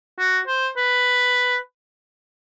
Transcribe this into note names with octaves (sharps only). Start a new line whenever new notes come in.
F#4
C5
B4